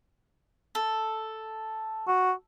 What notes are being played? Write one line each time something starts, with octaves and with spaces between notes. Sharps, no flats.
A4
F#4